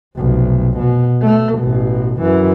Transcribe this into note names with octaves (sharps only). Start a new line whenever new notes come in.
F1 B1
B2
A3
A1 B2
F#2 E3